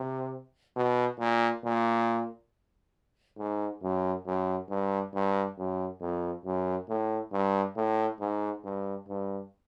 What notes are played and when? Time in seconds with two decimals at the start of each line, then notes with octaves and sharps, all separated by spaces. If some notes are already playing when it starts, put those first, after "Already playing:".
Already playing: C3
0.76 B2
1.19 A#2
1.64 A#2
3.38 G#2
3.83 F#2
4.26 F#2
4.69 G2
5.14 G2
5.58 F#2
6.01 F2
6.45 F#2
6.89 A2
7.32 G2
7.76 A2
8.20 G#2
8.64 G2
9.08 G2